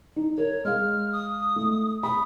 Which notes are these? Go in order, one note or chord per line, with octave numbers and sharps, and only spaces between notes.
D#4
A#4 C#5
G#3 F5 F6
D#6
A3
B5 D#6